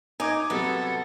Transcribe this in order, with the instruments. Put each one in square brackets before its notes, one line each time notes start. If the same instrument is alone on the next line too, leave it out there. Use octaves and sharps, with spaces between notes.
[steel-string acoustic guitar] D#4 [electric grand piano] G#5 D6 G#6
[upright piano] F#2 C3 G3 [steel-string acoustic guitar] B3 [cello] A4